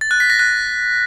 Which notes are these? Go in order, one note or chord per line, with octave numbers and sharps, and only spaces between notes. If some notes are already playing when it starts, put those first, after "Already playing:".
A6
F#6
B6
A#6
F#6